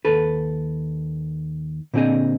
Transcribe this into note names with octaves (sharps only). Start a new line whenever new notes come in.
D#2 A4 B4
A#2 D3 C4 F#4 G#4 D#5